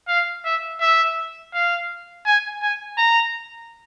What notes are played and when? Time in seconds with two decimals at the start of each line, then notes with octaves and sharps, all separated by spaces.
0.08 F5
0.45 E5
0.80 E5
1.54 F5
2.26 G#5
2.62 G#5
2.98 A#5